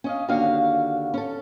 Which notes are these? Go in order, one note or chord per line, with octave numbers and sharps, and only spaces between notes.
C#4 D#5 F5
D#2 D3 C#4 F#4 F5
C#4 A4